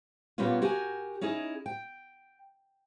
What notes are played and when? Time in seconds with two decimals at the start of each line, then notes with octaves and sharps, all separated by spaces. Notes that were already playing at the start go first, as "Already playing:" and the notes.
0.38 A#2 G3 A#3 B3 C#4 F4
0.62 F#4 G4 A#4 D#5 G#5
1.21 C#4 D#4 E4 G#4
1.66 G5